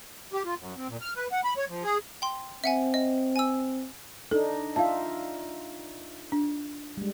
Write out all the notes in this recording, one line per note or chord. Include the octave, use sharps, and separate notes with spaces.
G4
F4
F#2
C4
A#2
F6
B4
F#5
B5
C#5
F3
G#4
G5 C6
C4 E5 F#5 G#5
D#5
G#5 E6
D4 D#4 A4
D#4 F4 E5 F5 A5
D4
G3 G#3